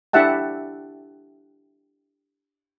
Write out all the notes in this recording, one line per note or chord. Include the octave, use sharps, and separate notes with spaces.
D4 E4 G4 E5 F#5 A5